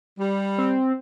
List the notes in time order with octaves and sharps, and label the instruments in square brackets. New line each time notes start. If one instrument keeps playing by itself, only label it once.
[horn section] G3
[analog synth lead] C4